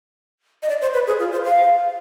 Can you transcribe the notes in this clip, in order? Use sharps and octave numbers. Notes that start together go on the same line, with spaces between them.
D#5
D5
C5
B4
G#4
F4
C5
F5